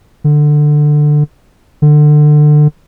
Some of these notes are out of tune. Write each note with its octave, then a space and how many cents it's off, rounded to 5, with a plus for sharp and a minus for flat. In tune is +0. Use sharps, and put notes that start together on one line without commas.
D3 +15
D3 +25